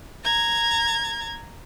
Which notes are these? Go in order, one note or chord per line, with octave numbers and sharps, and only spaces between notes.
A#5 G#6